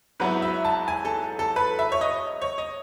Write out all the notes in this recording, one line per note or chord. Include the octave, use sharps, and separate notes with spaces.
G#2 F#3 B3 E4 B4
E5
A5
G#5
A4
A4
B4
E5
C#5
D#5
C#5
D#5